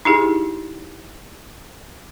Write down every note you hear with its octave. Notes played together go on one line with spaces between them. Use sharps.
D#4 E4 G4 G#4